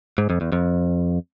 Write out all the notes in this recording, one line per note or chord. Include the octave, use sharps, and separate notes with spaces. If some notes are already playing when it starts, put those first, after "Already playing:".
G#2
F2
E2
F2